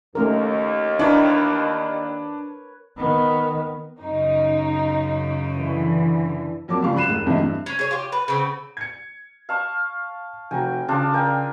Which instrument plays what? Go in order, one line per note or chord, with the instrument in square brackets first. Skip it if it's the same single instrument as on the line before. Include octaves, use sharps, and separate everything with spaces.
[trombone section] D#2 [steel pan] A3 C#4 A#4
[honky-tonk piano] D4 [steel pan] E4 [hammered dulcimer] A#4 B4 C#5
[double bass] D#3 B3
[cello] F#2 C#3 [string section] D#4
[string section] D3 E3
[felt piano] F2 F#3 A#3 A5 D6
C#2 G3 F5 C#6
F#2 B5 F#6 C7 D#7 E7
E1
F1 G2 E3 F#3 D#5 E5
G2
[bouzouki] C#4
G#4 C#5
F4 G4
B4
C#3 B3 C4
[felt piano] G#6 C#7
[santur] F5 A5 C#6
[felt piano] F1 F#4 A#5 [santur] G5 G#5
[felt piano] C#3 [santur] D4 F4 A5
[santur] A#4 G5 G#5